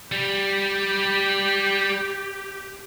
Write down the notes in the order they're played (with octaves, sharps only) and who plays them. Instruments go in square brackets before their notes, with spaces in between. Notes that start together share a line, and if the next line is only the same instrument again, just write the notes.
[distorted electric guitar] G3 [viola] G4